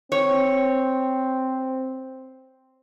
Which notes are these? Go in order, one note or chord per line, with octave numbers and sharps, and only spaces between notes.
C4 C#5